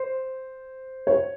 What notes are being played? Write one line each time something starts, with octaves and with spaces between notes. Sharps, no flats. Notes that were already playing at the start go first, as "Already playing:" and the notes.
Already playing: C5
C#5